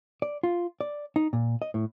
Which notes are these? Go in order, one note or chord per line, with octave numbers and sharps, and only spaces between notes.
D5
F4
D5
D#4
A#2
D#5
A2